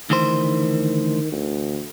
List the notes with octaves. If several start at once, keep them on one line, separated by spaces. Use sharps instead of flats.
D2 D#3 E3 C5
D2